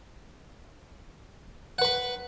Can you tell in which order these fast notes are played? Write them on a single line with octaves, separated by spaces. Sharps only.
F#5 B4 B5